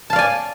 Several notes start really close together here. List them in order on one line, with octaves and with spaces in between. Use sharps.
A5 F5 D5 G#5